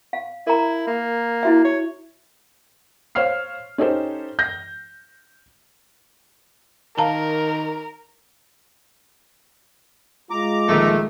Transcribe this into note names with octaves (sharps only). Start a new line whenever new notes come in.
F5
E4 A#4 A#5
A#3
E4 F#4 E5
C#5
C5 C#5 F5 F6 C7
C#4 D#4 G4 A4 C5
G6 A#6
D#3 A#4 F5 A5 A#5
G#3 F4 A#5 D6
A#1 D#3 A3